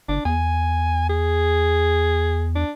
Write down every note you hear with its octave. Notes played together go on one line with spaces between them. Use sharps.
G1 D4
E2 G#5
G#4
D4